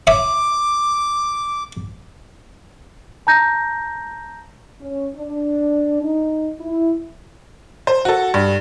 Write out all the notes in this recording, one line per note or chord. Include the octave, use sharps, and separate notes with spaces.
C#5 E5 D6 D#6
A5 A#5 G6 A#6
C#4
D4
D#4
E4
C5
F#4 A4
G2